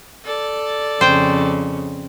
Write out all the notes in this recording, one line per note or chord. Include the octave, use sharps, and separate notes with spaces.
A4 D5
F2 C#3 C5 G5